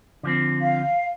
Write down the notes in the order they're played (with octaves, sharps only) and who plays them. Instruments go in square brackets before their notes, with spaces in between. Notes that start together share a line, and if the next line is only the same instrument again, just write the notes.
[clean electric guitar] D3 F3 C4
[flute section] F5